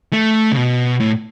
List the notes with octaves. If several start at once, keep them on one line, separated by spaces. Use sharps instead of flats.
A3
C#3
B2
A2